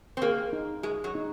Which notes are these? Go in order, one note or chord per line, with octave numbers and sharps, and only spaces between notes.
C4
A#3 G#4
D#4
G#3 G#4
F#3
D#4